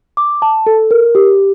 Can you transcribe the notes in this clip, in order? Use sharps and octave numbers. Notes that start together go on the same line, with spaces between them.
D6
A5
A4
A#4
G4